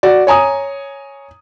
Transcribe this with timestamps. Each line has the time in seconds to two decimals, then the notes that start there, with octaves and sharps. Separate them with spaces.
0.03 F#4 D5
0.27 C#5 G#5 A#5 D#6